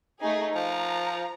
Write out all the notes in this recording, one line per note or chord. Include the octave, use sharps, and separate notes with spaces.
A3 D#4 G#4
F3 A#5